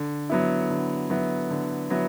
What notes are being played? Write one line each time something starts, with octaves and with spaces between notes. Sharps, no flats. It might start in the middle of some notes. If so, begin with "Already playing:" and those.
Already playing: D3
F#3 B3 E4
D3
F#3 B3 E4
D3
F#3 B3 E4